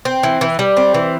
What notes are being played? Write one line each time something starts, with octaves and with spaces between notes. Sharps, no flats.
C4
E3
E3
G3
C4
E3